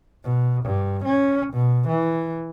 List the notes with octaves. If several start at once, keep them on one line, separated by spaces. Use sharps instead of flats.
B2
G2
C#4
B2
E3